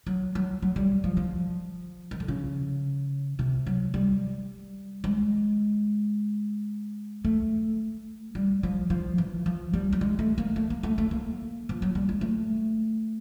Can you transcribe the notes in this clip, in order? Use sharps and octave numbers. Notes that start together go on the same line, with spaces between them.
F#3
F#3
F#3
G3
F3
F3
D#3
D3
C#3
C3
F#3
G3
G#3
A3
G3
F3
F3
E3
F3
G3
G3
G#3
A3
A#3
A3
A#3
A3
A3
A#3
F3
F#3
G3
G#3
A3